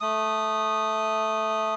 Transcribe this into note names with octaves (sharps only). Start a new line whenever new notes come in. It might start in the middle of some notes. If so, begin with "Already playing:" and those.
A3 D#6